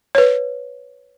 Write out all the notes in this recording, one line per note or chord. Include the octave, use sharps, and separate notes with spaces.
B4 C#5